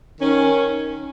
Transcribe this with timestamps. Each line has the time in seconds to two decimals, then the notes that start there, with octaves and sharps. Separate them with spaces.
0.21 D#3 C#4